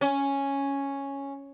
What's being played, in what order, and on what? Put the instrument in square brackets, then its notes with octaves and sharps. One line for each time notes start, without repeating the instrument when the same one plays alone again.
[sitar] C#4